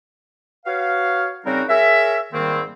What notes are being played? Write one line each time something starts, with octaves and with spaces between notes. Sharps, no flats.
F#4 B4 C#5 F5
C#3 G3 C4 D#4 F#4 A#4
G#4 A#4 C#5 E5
G#2 D#3 G3 A#3 C4